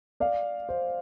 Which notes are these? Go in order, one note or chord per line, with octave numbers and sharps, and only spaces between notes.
D5 F5
C5